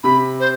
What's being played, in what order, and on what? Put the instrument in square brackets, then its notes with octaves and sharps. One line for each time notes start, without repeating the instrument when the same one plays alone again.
[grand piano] C3 [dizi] B5
[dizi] C5